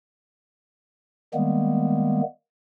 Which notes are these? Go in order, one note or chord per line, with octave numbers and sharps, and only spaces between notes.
D#3 G3 G#3 A#3 B3